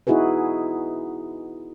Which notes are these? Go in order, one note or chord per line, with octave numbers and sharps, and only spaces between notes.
B3 D#4 E4 F#4 G#4 B4